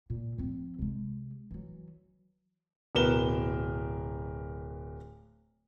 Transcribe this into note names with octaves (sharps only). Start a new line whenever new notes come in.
A#2
F3 C4
C3 G#3
E3 F#3
D1 B2 A#4 B4 E7 G7